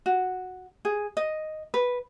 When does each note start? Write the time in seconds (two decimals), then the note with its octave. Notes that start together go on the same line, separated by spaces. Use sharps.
0.06 F#4
0.85 G#4
1.17 D#5
1.74 B4